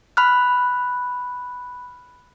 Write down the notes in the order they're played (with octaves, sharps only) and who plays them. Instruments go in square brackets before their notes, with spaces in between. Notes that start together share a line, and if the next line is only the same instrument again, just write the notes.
[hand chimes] B5 F6 F#6